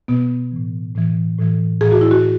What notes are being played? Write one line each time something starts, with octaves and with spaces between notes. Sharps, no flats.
B2 B3
A2 E3
A2 E3
A2 E3
A2 E3 G#4
F#4
E4
F#4